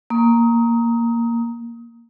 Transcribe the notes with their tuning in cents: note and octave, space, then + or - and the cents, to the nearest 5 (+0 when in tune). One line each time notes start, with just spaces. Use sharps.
A#3 +0 D#6 +25